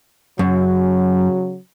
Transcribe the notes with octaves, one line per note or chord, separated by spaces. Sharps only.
F#2 C#3 F#3